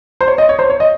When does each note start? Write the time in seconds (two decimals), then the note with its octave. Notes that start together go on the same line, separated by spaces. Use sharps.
0.21 C5
0.27 C#5
0.38 D#5
0.49 C#5
0.59 C5
0.70 C#5
0.80 D#5